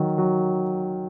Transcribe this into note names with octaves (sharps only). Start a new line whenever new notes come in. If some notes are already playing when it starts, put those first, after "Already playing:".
Already playing: D#3 F#3
F#3